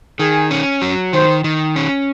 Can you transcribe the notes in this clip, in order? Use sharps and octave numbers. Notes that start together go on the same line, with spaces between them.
D#3 G#4
C#4
F#3
D#3 C5
D#3
C#4